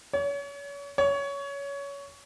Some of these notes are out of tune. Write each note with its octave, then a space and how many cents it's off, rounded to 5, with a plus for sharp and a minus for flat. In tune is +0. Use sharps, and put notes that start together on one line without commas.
C#5 +35
C#5 +20